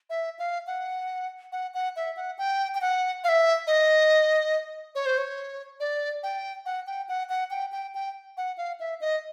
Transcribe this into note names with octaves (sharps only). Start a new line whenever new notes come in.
E5
F5
F#5
F#5
F#5
E5
F#5
G5
G5
F#5
F5
E5
D#5
C#5
C5
C#5
D5
G5
F#5
G5
F#5
F#5
G5
G5
G5
F#5
F5
E5
D#5